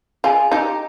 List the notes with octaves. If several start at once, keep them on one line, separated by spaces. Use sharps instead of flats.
F4 G#4
D#4 G4